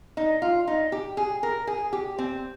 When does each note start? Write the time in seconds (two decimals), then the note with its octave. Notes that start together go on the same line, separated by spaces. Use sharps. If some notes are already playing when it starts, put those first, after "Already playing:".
0.17 D#4
0.42 F4
0.67 D#4
0.92 G4
1.17 G#4
1.43 A#4
1.67 G#4
1.93 G4
2.18 C4